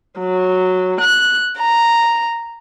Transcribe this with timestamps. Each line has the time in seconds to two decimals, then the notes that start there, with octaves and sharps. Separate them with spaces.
0.19 F#3
1.00 F#6
1.58 A#5